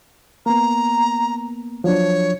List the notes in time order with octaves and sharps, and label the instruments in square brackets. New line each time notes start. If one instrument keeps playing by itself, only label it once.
[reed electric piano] A#3 B3 [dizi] A#5
[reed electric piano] F3 F#3 D4 [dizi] C#5